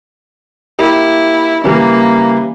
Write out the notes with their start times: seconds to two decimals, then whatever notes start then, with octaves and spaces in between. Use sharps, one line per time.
0.79 A#3 E4 G4
1.64 C#3 E3 G3 A#3